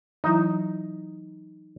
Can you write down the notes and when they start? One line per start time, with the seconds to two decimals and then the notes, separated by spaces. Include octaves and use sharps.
0.24 E3 F#3 D#4 E4